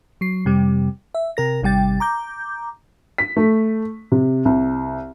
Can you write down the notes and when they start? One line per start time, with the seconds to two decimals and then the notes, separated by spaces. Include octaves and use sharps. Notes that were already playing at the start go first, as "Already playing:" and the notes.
0.21 F#3 C7
0.45 F2 C3 G3
1.15 E5
1.37 C3 A#4 A#6
1.62 G#1 C3 G3 G5 A6
2.00 A#5 D6 G6
3.18 B6
3.37 A3
4.12 C3
4.45 C2